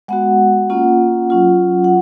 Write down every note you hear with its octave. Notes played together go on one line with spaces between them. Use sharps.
G#3 B3 F#4 F#5
A#3 C#4 F4
F#3 C#4 F4
F#5